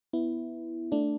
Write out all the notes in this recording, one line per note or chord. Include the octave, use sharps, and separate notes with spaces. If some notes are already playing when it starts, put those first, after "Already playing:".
B3 E4
A3 D4